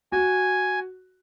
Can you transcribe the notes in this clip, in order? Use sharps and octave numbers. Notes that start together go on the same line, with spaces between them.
F#4 G#5